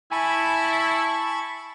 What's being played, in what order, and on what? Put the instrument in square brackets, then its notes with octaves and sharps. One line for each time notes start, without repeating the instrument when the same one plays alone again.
[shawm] E4 [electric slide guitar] G#5 [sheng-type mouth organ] A5 B5 C#6